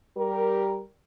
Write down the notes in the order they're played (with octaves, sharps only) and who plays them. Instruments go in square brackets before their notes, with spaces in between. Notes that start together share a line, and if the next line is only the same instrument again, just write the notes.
[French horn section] G3 G4 A#4